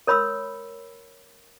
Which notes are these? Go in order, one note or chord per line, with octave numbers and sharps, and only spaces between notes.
A#4 C#5 B5 C6 E6